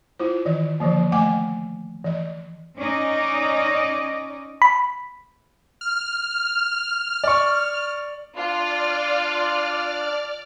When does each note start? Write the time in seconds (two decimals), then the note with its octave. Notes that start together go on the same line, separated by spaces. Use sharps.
0.19 E4 F4 C5
0.45 D#3 E3 D#5
0.80 D3 E3 F3 A#3
1.12 A3 D#5 F#5 G#5 D6
2.04 E3 D#5
2.77 C#4 D#4 D5 D#5
4.62 B5
5.81 F6
7.24 D5 C#6
8.36 D4 F4 D5 F6